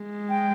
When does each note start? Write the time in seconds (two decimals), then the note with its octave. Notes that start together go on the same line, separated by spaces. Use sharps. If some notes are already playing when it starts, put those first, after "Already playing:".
Already playing: G#3
0.29 G5